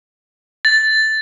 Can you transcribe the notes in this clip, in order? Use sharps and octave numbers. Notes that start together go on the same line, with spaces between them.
A6